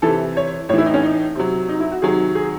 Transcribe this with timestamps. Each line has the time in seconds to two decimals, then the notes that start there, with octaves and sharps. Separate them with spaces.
0.02 C3 E3 A4
0.37 C#5
0.69 A2 C#5
0.73 E3 E4
0.86 D#4
0.94 C#4
1.03 D#4
1.35 C3 F#3
1.69 D#4
1.80 E4
1.91 F#4
2.02 C3 D#3 F#3 G#4
2.35 G#4